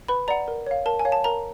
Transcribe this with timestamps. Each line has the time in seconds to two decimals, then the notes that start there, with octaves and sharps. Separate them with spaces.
0.08 B4 B5
0.28 D5 F#5 A#5
0.48 A#4
0.66 C#5 F5
0.86 A#4 A5
0.99 G#5
1.05 C#5 F5
1.12 A5
1.24 A#4 A#5